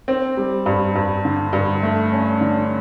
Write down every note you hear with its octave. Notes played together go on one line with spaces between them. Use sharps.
C4
G3
G2
G2
D3
G2
A3
C#4
D3